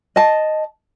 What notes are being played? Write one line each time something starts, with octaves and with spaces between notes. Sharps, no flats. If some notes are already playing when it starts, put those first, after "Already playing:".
D#5 A5